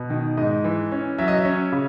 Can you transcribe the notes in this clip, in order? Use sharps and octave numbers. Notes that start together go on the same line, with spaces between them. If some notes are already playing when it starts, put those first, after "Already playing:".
Already playing: B2
D#3
G#2 D#5
E3
C#4
F#3 E5
D#5
E5
C#4
C#3